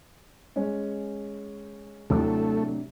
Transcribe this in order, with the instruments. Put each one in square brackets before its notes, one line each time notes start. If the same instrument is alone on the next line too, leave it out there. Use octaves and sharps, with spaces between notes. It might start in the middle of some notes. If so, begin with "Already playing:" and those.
[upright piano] G#3 C#4
[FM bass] D#2 [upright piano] A2 F#3 [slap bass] C3 C4 D4 [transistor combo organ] A3